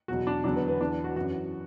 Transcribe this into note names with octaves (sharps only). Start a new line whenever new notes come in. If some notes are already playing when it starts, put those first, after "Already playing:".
E2 B2 F#3 F#4
D4
E2 D3 F#3 D4
B3
B3
E2 E3 D4
F#4
F#2 E3 F#4